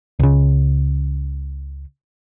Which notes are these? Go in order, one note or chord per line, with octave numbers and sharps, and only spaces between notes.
C#2 C#3